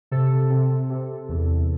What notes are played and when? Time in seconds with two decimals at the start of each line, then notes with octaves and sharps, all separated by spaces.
0.11 C3 A4
0.50 C3
0.90 C3
1.29 E2